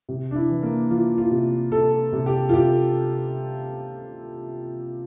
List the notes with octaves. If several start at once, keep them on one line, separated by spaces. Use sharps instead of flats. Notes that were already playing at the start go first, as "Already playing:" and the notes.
C3
D4
E4
E3
A#3
E3 F4
F4
C3
C3 A4
C3
G4
F4
C3 G4